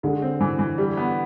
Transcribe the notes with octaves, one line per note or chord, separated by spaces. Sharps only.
D3 G#3
C4
E3
E3
G3
B3